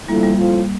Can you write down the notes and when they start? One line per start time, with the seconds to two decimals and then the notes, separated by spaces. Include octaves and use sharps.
0.08 D3 F3 G3 A3 A#3 E4
0.23 G3
0.38 A2 F3 C4 F4